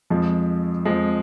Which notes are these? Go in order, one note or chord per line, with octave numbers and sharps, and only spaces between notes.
F2 F3 G#3
F2 F3 G#3